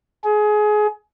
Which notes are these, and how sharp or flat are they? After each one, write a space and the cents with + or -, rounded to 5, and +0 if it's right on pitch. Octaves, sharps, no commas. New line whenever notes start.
G#4 +25